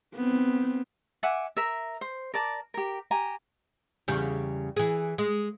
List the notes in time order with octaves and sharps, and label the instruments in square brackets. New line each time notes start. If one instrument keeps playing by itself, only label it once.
[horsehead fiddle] B3 C4
[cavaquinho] E5 F#5 G#5 D6
A#4 E5
C5
A#4 D5 A5 D6
G4 A#4
G4 G#5 A#5
[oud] E2 C#3 G3
E3 G#4
G#3